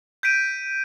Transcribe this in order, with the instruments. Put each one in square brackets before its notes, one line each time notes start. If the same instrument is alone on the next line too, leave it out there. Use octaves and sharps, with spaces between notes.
[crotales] G6 B6 D7 D#7